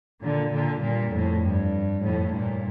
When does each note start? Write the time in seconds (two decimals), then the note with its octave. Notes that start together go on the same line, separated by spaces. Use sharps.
0.22 A#2 D3
0.53 A#2 D3
0.83 G2 A#2
1.13 F2 A2
1.44 G2
2.05 F2 A2
2.35 G2 A#2